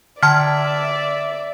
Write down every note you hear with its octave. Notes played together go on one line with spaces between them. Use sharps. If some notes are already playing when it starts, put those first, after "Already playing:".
D3 D5 E5 A5 F6 G#6